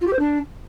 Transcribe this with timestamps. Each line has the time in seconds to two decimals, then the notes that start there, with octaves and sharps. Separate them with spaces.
0.01 F4
0.07 G4
0.13 C5
0.19 D4